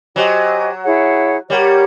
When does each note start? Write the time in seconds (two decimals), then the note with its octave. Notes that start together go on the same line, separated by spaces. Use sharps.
0.16 F#3 G4 C5 D#5 G#5
0.83 E4 G#4 C#5 F#5
1.50 G3 G4 A#4 C#5 F#5